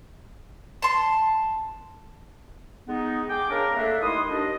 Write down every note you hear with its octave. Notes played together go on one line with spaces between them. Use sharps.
A5 C6
G#3 B3 D#4
G#4 G5 D6
C#3 D4 A#4
A3 A#3 D4 E5
D#2 D#3 G#3 E4 C6 D#6
D#2 D4 D#5